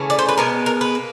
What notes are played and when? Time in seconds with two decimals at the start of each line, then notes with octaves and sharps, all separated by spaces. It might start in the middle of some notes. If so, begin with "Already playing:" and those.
Already playing: C#3 E3 A3 C#4
0.10 D5
0.19 C5
0.29 B4
0.38 B2 G#3 B3 A#4
0.66 A#4
0.81 B4
0.95 A#3